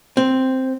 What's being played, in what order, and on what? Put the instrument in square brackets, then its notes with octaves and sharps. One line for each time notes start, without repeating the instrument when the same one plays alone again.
[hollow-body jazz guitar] C4